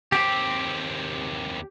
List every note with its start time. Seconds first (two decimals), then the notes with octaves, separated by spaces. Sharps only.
0.12 D#2 C4 G4